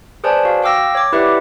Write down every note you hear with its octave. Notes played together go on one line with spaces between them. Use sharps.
G#4 B4 C5 D5 G#5 A5
F#4 F5
F5 G5 D6 E6 A#6
C#5 D6
E4 G4 B4 D5 E5 F#5